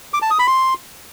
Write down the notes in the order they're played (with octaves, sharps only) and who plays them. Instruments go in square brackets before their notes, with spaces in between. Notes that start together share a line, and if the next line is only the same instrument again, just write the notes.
[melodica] D6
A5
D#6
B5
C6